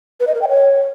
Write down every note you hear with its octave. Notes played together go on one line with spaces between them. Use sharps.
B4
D#5
A#4
G5
C#5